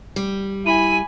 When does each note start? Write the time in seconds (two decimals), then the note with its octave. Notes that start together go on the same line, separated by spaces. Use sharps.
0.16 G3
0.66 E4 G#5 B5 D#7